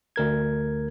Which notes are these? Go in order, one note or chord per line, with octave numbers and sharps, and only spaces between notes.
D2 A#4 G#6